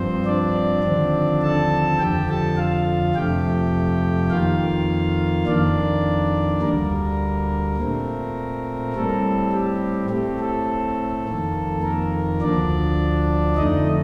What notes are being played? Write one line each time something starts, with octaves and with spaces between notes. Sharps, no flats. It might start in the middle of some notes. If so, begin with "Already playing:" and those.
Already playing: G2 F3 C4 C5
D4 D5
D#2 D3 F3 C4
A4 A5
F2 D3 F3 G4 G5
A4 A5
F4 F5
F2 C3 F3 A3 G4 G5
F2 D#3 A#3 F4 F5
F2 D#3 A#3 D4 D5
D2 D3 G3 A#3 A#4
A#2 A3 C4
A2 G3 C4 A4
G4
A2 A3 C4 G4
A4
F2 D#3 A#3
A#3 A#4
D2 D3 F3 D4 D5
F2 D3 A3 D#4 D#5